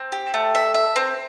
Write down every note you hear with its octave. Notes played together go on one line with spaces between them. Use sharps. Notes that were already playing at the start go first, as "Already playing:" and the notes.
Already playing: C4
G4
A3
E5
E5
C4